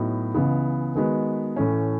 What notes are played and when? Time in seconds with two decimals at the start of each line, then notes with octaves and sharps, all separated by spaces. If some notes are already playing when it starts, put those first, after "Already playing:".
Already playing: A2 F#3 B3 D#4
0.34 C#2 C#3 E3 B3
0.95 D#3 G#3 B3 F#4 B4
1.56 A2 E3 A3 C#4